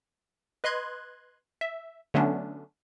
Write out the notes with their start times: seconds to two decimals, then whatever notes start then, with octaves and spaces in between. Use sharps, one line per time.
0.64 B4 D#5 C6 F#6 G#6
1.61 E5
2.14 D3 F#3 A3 B3 C#4 D4